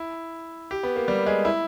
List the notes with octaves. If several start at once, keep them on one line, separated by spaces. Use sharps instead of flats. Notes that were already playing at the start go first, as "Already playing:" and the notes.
Already playing: E4
G4
B3
A#3
G3
G#3
E4